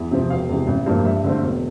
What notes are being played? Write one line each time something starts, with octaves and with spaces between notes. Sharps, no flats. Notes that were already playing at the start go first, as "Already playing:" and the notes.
Already playing: E2
C3 F3 C4
E1 F5
E2 C3
A1
G2 F3 A#3
G2 E5
D3 A3 C4
E1